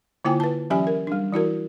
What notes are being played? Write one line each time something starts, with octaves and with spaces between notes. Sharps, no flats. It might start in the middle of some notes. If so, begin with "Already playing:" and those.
D3 A#3 E4 F4 G5 G#5
B4 A5
E3 F#3 C#4 G4 E5 G#5
A#4
G3 D4
E3 E4 F#4 A#4